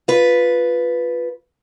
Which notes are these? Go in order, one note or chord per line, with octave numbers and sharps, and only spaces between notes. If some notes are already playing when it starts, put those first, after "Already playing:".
F4 B4